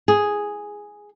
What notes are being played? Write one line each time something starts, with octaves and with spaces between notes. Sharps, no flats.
G#4